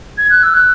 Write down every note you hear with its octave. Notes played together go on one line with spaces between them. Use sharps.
G#6
F#6
E6
F#6